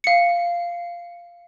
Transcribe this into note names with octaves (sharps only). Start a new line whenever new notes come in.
F5 C#7